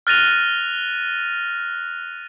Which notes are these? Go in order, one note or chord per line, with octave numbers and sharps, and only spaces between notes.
F6 F#6 A6 A#6 D#7 F7